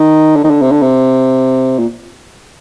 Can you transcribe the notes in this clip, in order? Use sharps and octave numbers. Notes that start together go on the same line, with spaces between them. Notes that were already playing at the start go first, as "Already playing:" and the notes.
Already playing: D#3
D3
D#3
D3
C3
D3
C3
A#2